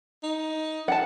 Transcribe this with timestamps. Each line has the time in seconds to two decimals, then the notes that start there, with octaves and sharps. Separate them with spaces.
0.23 D#4
0.88 F#5 A5